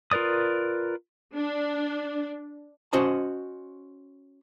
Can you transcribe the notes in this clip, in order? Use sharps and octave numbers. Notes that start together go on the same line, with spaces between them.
F4 A#4 B4 D5 D#6
D4
C#4 F#4 C5 D#5 A5